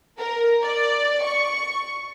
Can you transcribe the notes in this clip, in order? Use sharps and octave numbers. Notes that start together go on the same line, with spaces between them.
A#4
D5
C#6